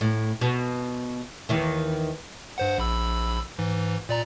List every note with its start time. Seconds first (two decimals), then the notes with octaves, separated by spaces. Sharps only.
0.01 A2
0.41 B2
1.49 D#2 D#3 E3
2.58 G2 C5 F#5
2.78 A#1 B5 E6
3.59 G#2 E3
4.09 A#2 D5 A#5